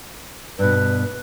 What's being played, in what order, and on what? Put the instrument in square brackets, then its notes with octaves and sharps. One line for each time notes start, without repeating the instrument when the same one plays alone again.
[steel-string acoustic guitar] G2 B2 [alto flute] B4